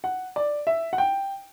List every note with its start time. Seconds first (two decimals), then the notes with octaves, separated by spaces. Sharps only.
0.04 F#5
0.36 D5
0.67 E5
0.93 F#5
0.98 G5